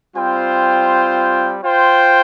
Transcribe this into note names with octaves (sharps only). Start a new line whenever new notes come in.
G3 C4 F4 C5 G5
F4 C5 G5